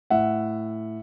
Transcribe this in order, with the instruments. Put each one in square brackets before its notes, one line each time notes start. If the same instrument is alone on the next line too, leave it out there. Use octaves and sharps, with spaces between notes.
[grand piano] A2 E5 F#5